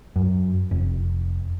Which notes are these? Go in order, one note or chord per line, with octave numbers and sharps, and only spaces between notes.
F#2
F1